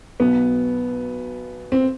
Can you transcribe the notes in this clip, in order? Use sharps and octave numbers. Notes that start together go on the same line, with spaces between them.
B1 B2 B3
C4